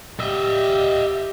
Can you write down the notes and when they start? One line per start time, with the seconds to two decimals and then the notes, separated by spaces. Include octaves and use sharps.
0.19 G4 D#5 E5